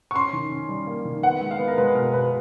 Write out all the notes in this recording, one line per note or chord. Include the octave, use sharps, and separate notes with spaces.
C#6
C#4 C6
D#3
C#4
G3
A#3
D#3
B3 F#5
G#3
F5
B3
A#4
G#3 B4
B2 A#4
B2 B4